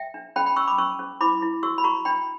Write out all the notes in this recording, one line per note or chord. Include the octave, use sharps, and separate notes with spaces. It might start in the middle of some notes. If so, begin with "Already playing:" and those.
Already playing: E5 G5
D4
C#4 G5 B5
G5 B5
C#4 C#6 E6
B5 D6
C#4 C#6 E6
C#4
E4 B5 D6
E4
F#4 C#6 E6
B5
F#4 A#5 C#6
D4 G5 B5